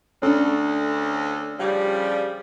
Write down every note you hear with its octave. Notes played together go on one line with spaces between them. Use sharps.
D2 C#4 D4 A4
C#3 F3 G3